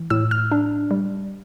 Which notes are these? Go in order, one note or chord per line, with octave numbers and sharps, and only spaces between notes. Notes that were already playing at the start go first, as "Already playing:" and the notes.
Already playing: E3
A2 E6
F6
D4
G3